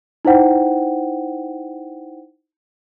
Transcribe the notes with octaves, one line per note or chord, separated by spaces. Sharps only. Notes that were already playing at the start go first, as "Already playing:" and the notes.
D#4 E4 C5 F#5 G5